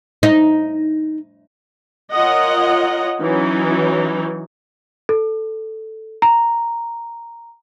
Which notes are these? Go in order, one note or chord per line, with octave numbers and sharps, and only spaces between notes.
D#4
F4 A#4 C#5 D#5 F#5
E3 F#3 C#4 D#4
A4
A#5